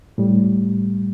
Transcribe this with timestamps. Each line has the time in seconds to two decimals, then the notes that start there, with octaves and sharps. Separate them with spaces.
0.18 A2 G3